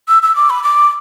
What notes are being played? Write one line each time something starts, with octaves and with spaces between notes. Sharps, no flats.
E6
E6
D6
B5
D6